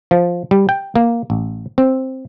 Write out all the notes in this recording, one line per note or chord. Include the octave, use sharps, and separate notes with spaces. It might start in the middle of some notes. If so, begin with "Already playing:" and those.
F3
G3
G5
A#3
A1
C4